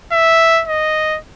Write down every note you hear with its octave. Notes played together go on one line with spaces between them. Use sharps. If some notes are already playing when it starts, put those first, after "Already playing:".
E5
D#5